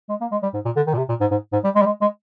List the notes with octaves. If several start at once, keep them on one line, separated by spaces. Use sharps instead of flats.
G#3
A#3
G#3
G3
G#2
A#2
D3
D#3
A#2
C3
A#2
G#2
G#2
G#2
G3
G#3
G3
G#3
G#3